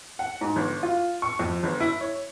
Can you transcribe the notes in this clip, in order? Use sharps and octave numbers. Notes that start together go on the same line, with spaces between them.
F#5
G#2
G1
F4
C#6
F2
G1
E4
C#5